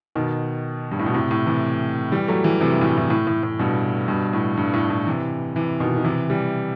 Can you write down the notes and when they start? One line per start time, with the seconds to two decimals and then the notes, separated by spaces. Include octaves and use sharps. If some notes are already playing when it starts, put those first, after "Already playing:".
0.15 B2 D#3
0.91 G2
0.99 A2
1.06 B2
1.14 A2 C3
1.31 A2
1.46 C3 E3
2.12 E3 G3
2.28 F#3 A3
2.44 E3 G3
2.61 C3 E3
2.74 G2
2.81 A2
2.85 G2
2.98 A2
3.10 A2
3.27 A2
3.43 A2
3.59 G2 B2
4.08 G2 B2
4.33 A2
4.57 G2
4.74 A2
4.90 A2
5.07 C3 E3
5.56 C3 E3
5.80 B2 D#3
5.96 D#3
6.04 C3 E3
6.30 E3 G3